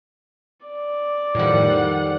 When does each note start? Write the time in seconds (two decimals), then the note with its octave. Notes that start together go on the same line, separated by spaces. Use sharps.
0.66 D5
1.35 F2 A2 D#3 F3 G3 F#5